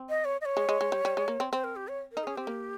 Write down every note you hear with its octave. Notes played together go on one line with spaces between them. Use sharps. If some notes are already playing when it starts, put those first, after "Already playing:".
Already playing: C4
D#5
C#5
D#5
C#5
G#3
G#3
G#3
G3
G3
G#3
A#3
C4
C4 C5
A#4
G4
C#5
A#4
D#4
C#4 G#4
C4 G4
A#3